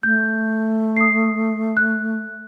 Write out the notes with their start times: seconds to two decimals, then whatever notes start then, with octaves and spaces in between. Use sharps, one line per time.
0.03 A3 G6
0.97 D#6 C7
1.77 F#6